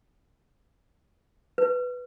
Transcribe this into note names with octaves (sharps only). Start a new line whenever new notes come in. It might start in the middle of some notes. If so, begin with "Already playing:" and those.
B4